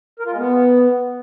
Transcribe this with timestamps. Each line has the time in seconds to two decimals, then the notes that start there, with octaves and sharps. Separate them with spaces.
0.20 A#4
0.26 F4
0.32 G#3
0.38 B3